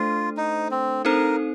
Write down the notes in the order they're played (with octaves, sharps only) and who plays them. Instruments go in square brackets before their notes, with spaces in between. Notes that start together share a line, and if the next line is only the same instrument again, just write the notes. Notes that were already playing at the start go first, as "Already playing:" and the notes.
Already playing: [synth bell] A3 D4 A4 C5 [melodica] F4
[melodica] D#4
C4
[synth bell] C4 D#4 A4 C5 [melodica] A#4